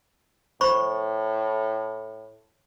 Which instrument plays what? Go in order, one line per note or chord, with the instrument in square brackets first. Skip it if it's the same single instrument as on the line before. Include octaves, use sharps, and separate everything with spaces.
[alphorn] A2 [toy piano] C5 B5 C#6